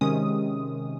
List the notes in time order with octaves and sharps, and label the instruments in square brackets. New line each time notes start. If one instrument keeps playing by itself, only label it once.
[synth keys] C3 D#3 G#3 C#4 D#6